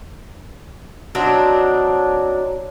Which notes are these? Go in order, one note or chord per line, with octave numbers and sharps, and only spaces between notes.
F#3 C4 D4 D#4